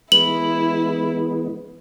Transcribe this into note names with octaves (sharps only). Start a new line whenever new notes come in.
E3 G#3 B3 E4 F#7